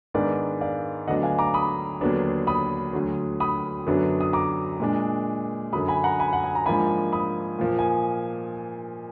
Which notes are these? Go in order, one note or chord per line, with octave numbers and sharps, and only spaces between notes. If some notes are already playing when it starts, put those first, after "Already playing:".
G#2 D#3 G#3 B3 D4 A#4 D5
D5 F5
D2 D3 F#3 B3 D4 D#5 F#5
F5 G#5
A#5 D6
B5 D#6
D#2 D3 F#3 B3 D4
B5 D#6
D2 D3 F#3
B5 D#6
F#2 D3 F#3 B3 D4
D#6
A#5 D6
A#2 G#3 D4
F#2 D3 F#3 B5 D#6
G#5 B5
F#5 A#5
G#5 B5
F#5
G#5
A#5
G#2 F3 A#3 D4 G#5 B5
B5 D#6
A#2 F3 A#3
G#5